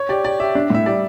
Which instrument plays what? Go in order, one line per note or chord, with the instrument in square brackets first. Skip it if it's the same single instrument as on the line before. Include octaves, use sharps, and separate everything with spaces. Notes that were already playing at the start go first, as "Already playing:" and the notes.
Already playing: [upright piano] C#5
[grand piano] G4 [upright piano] D5
[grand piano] G4 [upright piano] D5
[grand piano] G4 [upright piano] E5
[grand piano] D4
[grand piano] A2 [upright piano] E5
[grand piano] G3 [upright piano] D5